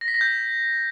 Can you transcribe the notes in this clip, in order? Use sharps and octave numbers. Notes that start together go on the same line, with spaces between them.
A#6
B6
A#6
G6